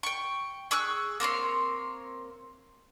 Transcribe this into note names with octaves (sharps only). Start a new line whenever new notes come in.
G5 C#6
G#4 C#6 E6 F#6
A#3 C4 C#5 C6